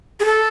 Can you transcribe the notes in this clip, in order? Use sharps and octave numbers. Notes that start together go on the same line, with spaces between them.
G#4
A4